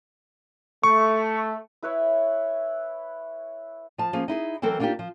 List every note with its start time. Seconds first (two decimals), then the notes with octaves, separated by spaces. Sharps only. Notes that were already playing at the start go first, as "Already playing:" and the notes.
0.83 A3 C#6
1.83 E4 B4 C#5 E5
3.98 F3 A5
4.13 F3 A#3 C#4 F4 G#4
4.28 D#4 E4 G#4
4.62 E3 F#3 C4 A4 A#4
4.80 A#3 B3 D4 D#4 F4 G4
4.99 F3